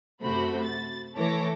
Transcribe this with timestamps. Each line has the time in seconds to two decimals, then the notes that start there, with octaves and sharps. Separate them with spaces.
0.22 F#2 C3 A3 F#4 C5 B5
0.63 A6
1.15 E3 A3 A4 C#5 D6 A#6